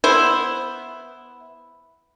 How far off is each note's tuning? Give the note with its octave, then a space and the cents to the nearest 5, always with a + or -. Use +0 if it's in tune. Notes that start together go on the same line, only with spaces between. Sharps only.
B3 +0 E4 +0 C5 +0